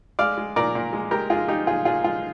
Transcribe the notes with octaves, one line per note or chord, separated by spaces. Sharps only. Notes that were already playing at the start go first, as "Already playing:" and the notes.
G#3 D5 F5
G#3
A#2 A#4 D5
A#2
G#3
G#3 G4 A#4
G#3 F4 G#4
G#3 D#4 G4
A#2 F4 G#4
A#2 F4 G#4
G#3 F4